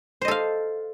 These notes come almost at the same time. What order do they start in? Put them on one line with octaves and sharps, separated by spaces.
C5 D#5 A4 F5